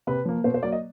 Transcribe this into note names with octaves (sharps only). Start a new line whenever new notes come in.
C3 B4
F3 A#3
B2 C5
C5
F#3 A#3 D5
D#5